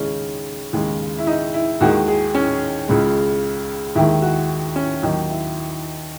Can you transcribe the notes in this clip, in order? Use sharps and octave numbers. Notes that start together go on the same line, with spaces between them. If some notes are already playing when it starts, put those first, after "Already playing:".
Already playing: D#2 C#3 G#3 C#4 D#4
D#2 C#3 G#3
E4
D#4
E4
D#2 D#3 G#3 F#4
G#4
C#4
C#2 C#3 G#3
D#2 D#3 G#3 E4
F#4
C#4
D#2 D#3 F#3 D#4
E4